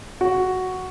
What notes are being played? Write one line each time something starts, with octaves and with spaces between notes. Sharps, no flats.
F#4